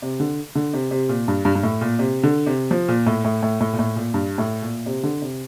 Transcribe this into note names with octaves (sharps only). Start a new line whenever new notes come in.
C3
D3
D3
C3
C3
A#2
G2
G2
G2
A2
A#2
C3
D3
C3
F3
A#2
A2
A2
A2
A2
A#2
A2
A#2
G2
A2
A#2
C3
D3
C3